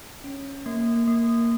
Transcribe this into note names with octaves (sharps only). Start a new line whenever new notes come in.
C#4
A#3
A#3